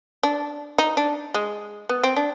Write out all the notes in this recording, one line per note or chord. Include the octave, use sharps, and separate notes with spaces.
D4
D#4
D4
G#3
B3
C4
D4